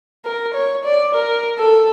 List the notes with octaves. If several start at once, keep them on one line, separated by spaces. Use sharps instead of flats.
A#4
C#5
D5
A#4
A4